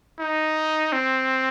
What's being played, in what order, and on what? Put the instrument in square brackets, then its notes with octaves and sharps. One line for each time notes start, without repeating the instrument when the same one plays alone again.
[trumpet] D#4
C4